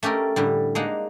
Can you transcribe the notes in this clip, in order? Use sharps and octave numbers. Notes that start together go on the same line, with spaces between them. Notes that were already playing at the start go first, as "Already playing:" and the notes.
A3 C#4 G4 A4 A#4
A2 D3 G3
G#3 A#3 D4 D#4 F#5